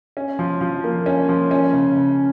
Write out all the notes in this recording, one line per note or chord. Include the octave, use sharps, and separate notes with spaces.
C#4
F3
F3
A#3
C#4
F3
C#4
C#3
C#3